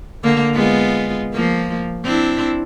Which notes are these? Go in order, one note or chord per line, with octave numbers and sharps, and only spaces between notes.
D3 A#3
G#3 B3 F4
F3 A#3
C4 D4 E4